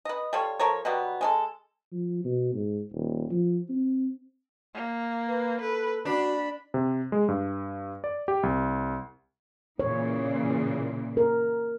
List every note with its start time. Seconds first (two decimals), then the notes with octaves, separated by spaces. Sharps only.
0.05 B4 D#5
0.33 G3 F4 A4 C#5
0.60 F3 A4 A#4 C#5
0.85 B2 F#3 G3 B3
1.21 G#3 C#4 A4
1.92 F3
2.24 B2
2.54 G#2
2.93 D#1
3.31 F3
3.69 C4
4.74 A#3
5.28 B4
5.61 A4 B4
6.05 D4 F#4 B5
6.74 C3
7.12 G#3
7.28 G2
8.04 D5
8.28 G4
8.43 C2
9.80 A#2 C#3 E3 C#5
11.17 A#4